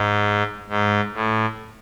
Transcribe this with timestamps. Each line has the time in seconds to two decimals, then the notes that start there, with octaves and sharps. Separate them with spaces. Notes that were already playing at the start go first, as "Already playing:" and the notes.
Already playing: G#2
0.69 G#2
1.15 A2